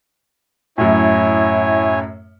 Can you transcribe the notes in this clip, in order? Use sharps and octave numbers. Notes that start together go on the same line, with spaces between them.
F#2 A2 E4 C#5 G#5